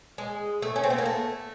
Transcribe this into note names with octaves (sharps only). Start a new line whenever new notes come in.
G#3
A3
C#4
C4
B3
A#3
A3